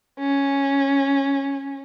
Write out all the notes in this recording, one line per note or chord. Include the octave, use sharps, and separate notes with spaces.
C#4